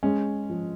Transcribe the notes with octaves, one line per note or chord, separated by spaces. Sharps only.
G#3 C#4
F3